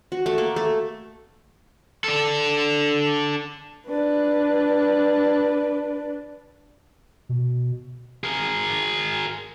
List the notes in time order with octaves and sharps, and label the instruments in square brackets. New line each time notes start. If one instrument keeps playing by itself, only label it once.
[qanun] F#4
A3
A#3
A3
[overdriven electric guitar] D4 A4
[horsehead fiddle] D4 B4
[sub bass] B2
[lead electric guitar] G#4 A#4